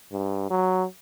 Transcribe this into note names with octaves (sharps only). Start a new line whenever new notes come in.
G2
F#3